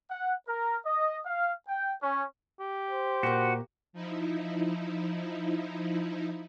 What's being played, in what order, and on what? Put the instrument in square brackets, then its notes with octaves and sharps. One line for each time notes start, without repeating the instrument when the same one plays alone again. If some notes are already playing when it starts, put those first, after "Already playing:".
[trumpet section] F#5
A#4
D#5
F5
G5
C#4
[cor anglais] G4
[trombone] C5
[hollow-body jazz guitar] A#2 A#3 [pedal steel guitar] F#4
[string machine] F3 D#4 E4